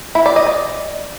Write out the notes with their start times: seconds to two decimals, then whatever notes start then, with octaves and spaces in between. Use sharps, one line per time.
0.15 E4
0.26 D5
0.36 D#5
0.47 D5